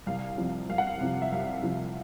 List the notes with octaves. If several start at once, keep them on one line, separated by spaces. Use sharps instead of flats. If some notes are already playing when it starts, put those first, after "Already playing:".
C2 F5
C3 F3
C2 F5
F#5
F5
C3 F3
E5
C2 F5
C3 F3